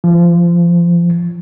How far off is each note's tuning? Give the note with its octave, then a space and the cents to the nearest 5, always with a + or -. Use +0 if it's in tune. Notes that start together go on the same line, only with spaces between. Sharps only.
F3 -25